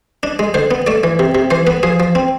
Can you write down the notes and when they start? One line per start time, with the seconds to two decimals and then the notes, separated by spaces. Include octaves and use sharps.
0.23 D4
0.39 G#3
0.54 D3 C5
0.71 B3
0.87 A3 D5
1.04 E3
1.19 C3
1.35 C3
1.51 E3 C5
1.67 B3 B4
1.83 F3 G#4
2.00 F3
2.15 C4